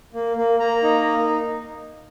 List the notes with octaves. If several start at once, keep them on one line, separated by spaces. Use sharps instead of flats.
A#3
A#3
A#3 A#5
D#4